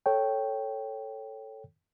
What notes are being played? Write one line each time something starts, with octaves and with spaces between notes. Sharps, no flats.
A4 C#5 G5